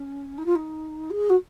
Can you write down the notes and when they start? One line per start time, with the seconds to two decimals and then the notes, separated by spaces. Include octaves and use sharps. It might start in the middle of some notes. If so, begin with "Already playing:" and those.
Already playing: C#4
0.38 D#4
0.46 F4
0.55 D#4
1.10 G#4
1.30 F#4